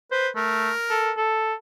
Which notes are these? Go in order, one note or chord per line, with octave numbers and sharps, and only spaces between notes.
B4 C5
A3 A#4
A4
A4